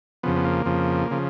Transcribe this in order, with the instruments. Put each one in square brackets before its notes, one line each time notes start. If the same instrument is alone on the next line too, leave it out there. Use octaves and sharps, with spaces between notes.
[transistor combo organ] F2 C#3 F3 B3
B3
A#3
F2 C#3 F3
C#3 F3